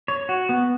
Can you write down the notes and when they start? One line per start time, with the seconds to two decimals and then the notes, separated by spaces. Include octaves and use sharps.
0.08 C#5
0.29 F#4
0.49 B3